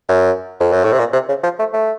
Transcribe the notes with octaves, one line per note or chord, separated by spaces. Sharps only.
F#2
F2
F#2
A2
C3
A#2
C3
C#3
F3
A3
A3